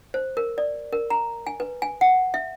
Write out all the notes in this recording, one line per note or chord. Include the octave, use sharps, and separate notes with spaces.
C5
A#4
D5
A#4
A#5
G#5
B4
G#5
F#5
E5